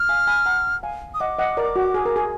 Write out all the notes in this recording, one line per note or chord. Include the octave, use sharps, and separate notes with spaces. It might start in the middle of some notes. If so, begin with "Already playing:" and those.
Already playing: F6
F5 G#5
G#5 B5
F#5 A#5
F5 G#5
D#6
D#5 F#5 D6
D#5 F#5
A#4 D5
F#4
G#4
A#4
G#4